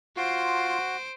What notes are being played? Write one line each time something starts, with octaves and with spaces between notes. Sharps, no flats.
F4 F#4 C5 C6 D7